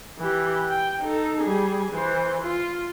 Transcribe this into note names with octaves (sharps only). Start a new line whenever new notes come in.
E3 G4
G5
D#4 A4
G3 G#4
E3 C5
F4